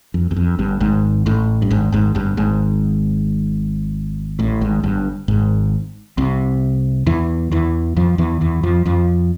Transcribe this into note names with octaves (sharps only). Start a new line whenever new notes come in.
F2
E2
F2
G1 G2
G#1 G#2
A1 A2
G2
G#1 G#2
G#1 G#2
G1 G2
G#1 G#2
A1 A2
G#1 G#2
G1 G2
G#1 G#2
C2 C3
E2 E3
E2 E3
F2 F3
E2 E3
E2 E3
F2 F3
F2 F3